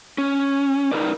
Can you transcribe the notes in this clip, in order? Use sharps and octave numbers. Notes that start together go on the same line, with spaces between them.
C#4
D#4 E4 A#4 B4 D5